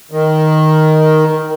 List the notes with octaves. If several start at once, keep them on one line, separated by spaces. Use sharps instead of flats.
D#3